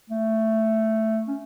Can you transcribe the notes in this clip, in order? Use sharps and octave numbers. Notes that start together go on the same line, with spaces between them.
A3
C#4